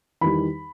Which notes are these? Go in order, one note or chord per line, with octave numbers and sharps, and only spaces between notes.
E2 D#3 G3 B5